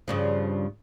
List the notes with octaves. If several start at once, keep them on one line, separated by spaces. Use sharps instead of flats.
G2 C#3 F3